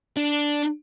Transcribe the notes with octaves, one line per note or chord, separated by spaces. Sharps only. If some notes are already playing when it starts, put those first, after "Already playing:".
D4